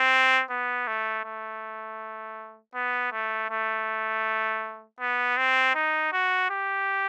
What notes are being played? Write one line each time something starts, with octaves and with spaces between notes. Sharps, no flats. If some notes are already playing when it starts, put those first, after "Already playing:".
Already playing: C4
B3
A3
A3
B3
A3
A3
B3
C4
D#4
F#4
G4